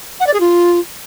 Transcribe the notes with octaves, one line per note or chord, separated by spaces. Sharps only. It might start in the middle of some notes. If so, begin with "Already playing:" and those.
F#5
D5
G#4
F4